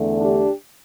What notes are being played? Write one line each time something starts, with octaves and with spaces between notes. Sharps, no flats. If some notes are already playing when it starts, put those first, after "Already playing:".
Already playing: E2 D3 A3
D4 G4